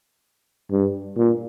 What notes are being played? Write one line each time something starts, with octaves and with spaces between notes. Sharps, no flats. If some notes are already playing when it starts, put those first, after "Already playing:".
G2
A#2